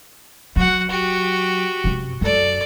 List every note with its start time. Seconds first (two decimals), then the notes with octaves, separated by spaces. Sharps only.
0.56 F#3 F#4 F#5
0.90 F#4 G4
1.84 F#2 C3
2.21 F#2 A4 D5